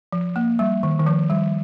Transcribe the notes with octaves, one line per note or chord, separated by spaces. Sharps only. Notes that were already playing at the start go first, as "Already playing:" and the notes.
F3
A#3
G3
D#3
D#3
F3
G3